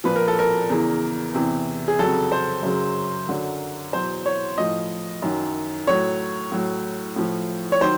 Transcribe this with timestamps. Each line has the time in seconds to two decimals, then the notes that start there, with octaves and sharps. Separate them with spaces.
0.04 A#2 F3 B4
0.16 A#4
0.28 A4
0.39 A#4
0.69 E2 C#3 E3
1.34 E2 C3 E3
1.88 G#4
1.99 F2 C#3 F#3 A4
2.32 C5
2.63 F#2 C#3 F#3
3.28 F#2 D3 F#3
3.93 E2 B2 F#3 C5
4.26 C#5
4.58 A2 F3 D#5
5.22 F#2 D#3 F#3
5.87 A2 F#3 C#5
6.52 A2 F#3
7.16 A2 F3
7.72 C#5
7.81 D#3 F#3 C5